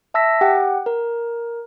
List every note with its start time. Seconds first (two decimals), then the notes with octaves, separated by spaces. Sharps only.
0.14 E5 A5 E6 A#6 B6
0.41 G4 F#5 G5
0.86 A#4